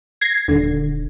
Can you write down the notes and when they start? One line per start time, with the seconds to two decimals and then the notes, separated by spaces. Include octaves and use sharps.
0.21 G#6 A#6 C7
0.48 D#1 D3